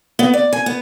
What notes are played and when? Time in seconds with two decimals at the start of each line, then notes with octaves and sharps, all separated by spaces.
0.19 B3
0.33 D5
0.53 G#5
0.66 B3